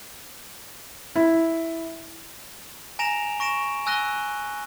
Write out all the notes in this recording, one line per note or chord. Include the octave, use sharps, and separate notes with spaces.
E4
G#5 A#5 A#6 D7 E7 F7
C#6 A#6 D7 E7
G#5 E6 F#6 A#6 D#7 G7